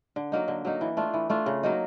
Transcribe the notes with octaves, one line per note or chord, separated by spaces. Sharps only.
D3
F#3 A#3 D#4
D3
F#3 A#3 D#4
E3
A3 D4 F4
E3
A3 D4 F4
C#3
F#3 A#3 D#4